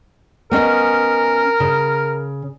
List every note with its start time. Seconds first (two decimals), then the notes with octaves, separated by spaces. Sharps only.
0.51 B3 C#4 A#4 D#5
1.60 C#3